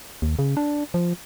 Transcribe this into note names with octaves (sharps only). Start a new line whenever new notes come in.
D#2
C#3
D4
F3